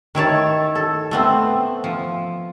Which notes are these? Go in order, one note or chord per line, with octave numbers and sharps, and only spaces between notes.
D#3 E4 C#5 A5
A4
A3 B3 C4
F3